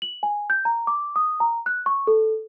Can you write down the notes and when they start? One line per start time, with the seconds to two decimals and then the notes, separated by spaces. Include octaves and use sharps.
0.02 F#7
0.23 G#5
0.50 G6
0.65 A#5
0.87 D6
1.16 D#6
1.40 A#5
1.66 F#6
1.86 C#6
2.07 A4